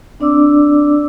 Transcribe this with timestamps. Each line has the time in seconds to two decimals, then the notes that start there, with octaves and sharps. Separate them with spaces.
0.20 C4 D4 D5 D6 E6